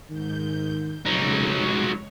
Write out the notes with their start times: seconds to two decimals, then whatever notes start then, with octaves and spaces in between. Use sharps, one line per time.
0.10 G#2 D#3 G6
1.06 F1 C#3 F#3 G#3 D#4 C#5